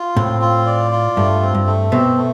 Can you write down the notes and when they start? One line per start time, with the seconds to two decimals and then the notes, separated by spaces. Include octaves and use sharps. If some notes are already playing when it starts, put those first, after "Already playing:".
Already playing: F4
0.17 A2 C4
0.41 F4
0.66 D5
0.92 F4
1.16 G2 A3
1.42 C4
1.55 G2
1.67 A3
1.91 B2 C4
2.18 A3